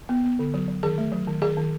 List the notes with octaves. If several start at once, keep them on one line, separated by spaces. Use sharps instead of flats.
B3
B3
D3
F#3
F#3
D#3 G#4
A3
F#3
D#3
D#3 G#4
D#3